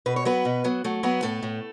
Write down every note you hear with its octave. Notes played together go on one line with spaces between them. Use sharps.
B2 B4
C#5
F#3 B3 B4
B2
F#3 B3
F#3 A3
F#3 B3 B4
A2 A3 A4
A2